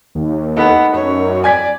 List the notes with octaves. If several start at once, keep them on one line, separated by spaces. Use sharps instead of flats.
D#2
A3 B3 D#4 A4
F#2 C#5
D5 G#5 G#6 B6